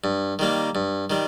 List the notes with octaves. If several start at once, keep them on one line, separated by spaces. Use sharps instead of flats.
G2
D#3 G3 A#3
G2
D#3 G3